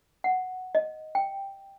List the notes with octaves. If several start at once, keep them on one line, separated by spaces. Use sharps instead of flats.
F#5
D#5
G5